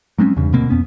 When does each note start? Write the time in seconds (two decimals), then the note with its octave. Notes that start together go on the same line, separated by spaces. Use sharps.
0.18 F#3 G#3 C4 C#4
0.37 E2 G2 C#3
0.53 D2 B2 A#3 C4
0.69 F2 B3 C#4